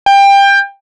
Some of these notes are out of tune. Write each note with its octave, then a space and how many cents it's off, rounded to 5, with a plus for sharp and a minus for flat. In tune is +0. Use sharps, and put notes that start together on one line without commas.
G5 +20